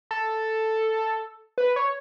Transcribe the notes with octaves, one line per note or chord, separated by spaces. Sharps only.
A4
B4
C#5